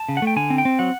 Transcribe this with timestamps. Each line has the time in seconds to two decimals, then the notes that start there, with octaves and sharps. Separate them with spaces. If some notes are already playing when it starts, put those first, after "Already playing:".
Already playing: A5
0.09 C#3
0.17 F#5
0.22 A3 G5
0.36 D3 G#5
0.50 C4
0.58 G5
0.65 C4
0.79 F#3 F#5